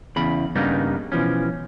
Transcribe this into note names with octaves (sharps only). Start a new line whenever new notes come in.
E2 C#3 B5
G2 C#3 G3 A#3 B3 D#4
B2 E3 F3 C#4